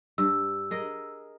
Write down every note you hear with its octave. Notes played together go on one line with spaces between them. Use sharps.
G2 E6
G#4 A#4 D#5